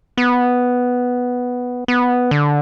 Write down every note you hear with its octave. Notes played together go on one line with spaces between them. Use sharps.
B3
B3
D3